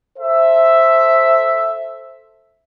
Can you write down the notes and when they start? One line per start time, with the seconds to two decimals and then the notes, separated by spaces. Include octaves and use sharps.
0.18 A4 C5 E5